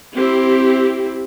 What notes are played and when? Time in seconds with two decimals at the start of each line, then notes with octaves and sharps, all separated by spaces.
0.15 C4 E4 G4